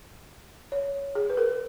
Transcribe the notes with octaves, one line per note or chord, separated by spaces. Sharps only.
C#5
G#4
B4
A#4